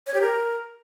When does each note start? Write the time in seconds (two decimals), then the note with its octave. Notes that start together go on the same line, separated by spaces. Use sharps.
0.06 C#5
0.14 G4
0.21 A#4